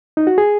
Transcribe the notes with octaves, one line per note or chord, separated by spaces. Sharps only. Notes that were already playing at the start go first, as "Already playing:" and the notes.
D#4
F#4
G#4